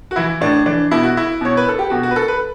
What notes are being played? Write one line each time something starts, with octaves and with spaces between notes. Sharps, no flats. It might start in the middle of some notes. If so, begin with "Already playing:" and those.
F#4
E3 E4
A2 D4
E3 D4
B2 E4
F#4
E4
B2 C#5
B4
A4
G4
B2 F#4
F#4
B4
A4
B4